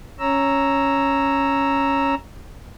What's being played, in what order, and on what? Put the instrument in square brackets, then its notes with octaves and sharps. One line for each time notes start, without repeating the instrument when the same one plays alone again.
[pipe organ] C#4 C#5 A#5 E6